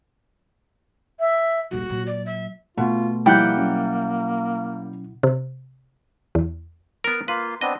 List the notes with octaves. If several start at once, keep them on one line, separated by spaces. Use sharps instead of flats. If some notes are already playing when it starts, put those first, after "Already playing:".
E5
D#1 A#1 F#4
A#2 F#3
D5
E5
B2 A3 B3 F4
F3 G3 A#3 E4 F#5 G5 G6
F#3 C#4
C3
E2
B3 A#4
A#3 F4 B4 C6
B3 C4 D4 D#5